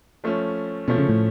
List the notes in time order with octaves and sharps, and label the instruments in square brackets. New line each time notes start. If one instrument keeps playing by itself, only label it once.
[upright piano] F3 A3 C#4
[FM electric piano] B2 [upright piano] F3 A3 C#4
[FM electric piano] C#3
A2